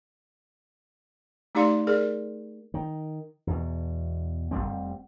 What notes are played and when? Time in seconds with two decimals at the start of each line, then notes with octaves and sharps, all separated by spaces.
1.55 A3 D#4 G4 D5 F5 C6
1.87 G#4 A#4 D5
2.74 D#3
3.47 E2 B2
4.51 F1 E2 G3 C4